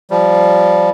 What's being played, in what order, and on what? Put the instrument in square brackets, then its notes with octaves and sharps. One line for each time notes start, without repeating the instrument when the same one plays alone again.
[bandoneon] F3 G3